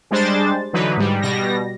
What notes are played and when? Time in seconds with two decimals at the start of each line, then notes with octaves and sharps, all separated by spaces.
0.11 G3 G#3 D4 C5 A6
0.73 D3 E3 F#3 D#4 B4
0.97 G#2 G3
1.21 B2 G3 A#6